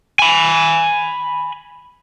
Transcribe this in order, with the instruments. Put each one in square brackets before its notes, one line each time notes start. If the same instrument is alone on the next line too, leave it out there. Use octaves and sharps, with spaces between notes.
[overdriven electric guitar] G#5 B5